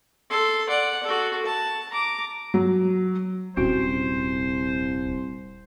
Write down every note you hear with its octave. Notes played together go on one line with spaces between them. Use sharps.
A4 C6
D5 F#5
F#4 A4
A5
A#5 D6
F#3
D#1 C2 C#4 F#4 C5